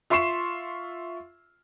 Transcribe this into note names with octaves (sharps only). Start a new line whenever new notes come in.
F4 E5 C6 C#6 C7 E7